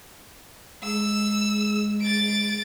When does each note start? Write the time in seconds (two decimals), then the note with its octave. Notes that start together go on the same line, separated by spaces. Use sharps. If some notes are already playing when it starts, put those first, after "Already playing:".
0.84 G#3 E6
2.01 A6 D7